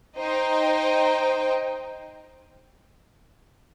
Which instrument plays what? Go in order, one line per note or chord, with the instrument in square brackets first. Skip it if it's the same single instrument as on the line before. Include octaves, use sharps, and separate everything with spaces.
[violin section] D#4 C5 D#5 G5